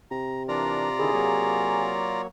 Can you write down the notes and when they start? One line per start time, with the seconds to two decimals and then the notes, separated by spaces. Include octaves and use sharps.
0.11 C3 A#5
0.48 E3 D4 F4 A#4 D5 A#5
0.99 D3 D#3 E4 G#4
1.14 F#3 A#3 C#5